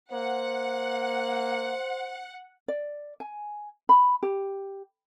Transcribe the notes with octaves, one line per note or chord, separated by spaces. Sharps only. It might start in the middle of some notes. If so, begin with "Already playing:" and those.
A#3 C5 F#5
D5
G#5
B5
G4